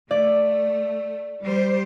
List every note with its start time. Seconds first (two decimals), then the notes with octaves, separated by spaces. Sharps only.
0.11 A3 D5
1.42 G3 C5